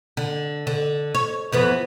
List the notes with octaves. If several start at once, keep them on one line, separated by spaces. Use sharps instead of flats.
D3
D3
C#5
F2 E3 B3